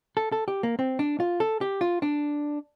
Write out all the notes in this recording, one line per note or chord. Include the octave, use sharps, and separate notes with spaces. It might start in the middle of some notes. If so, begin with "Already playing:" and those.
A4
A4
G4
A#3
C4
D4
F4
A4
G4
F4
D4